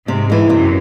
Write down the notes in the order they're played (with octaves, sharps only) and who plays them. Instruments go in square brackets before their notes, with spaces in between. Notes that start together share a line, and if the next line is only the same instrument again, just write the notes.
[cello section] G#2 [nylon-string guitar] C3
[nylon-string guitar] E3 G#3
[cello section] F#2 [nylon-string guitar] C3